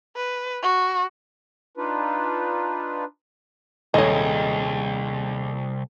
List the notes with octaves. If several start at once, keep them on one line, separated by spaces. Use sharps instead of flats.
B4
F#4
D4 D#4 F4 B4
D#1 C2 G#3 C#5 D#5